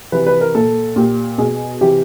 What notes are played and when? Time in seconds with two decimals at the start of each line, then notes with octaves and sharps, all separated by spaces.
0.12 C3 E3 B4
0.27 B4
0.41 A#4
0.55 A#2 A4
0.96 A#2 G4
1.38 B2 G#4
1.81 C3 E3 G4